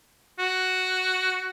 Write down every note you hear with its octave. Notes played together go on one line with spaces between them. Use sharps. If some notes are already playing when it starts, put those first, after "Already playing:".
F#4